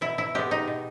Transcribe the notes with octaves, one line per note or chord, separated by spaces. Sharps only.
B2 E4
E4
G#3 B3 G4
D#4
B2